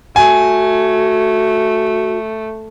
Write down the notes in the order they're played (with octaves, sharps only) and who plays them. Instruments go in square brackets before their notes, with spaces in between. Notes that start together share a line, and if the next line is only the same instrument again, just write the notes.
[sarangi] A3 [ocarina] F#4 [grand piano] G#5